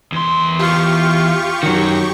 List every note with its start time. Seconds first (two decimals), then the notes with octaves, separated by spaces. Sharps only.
0.12 E2 C6
0.59 F4 G4 C#6
1.63 F#2 D#3 F#3 F#4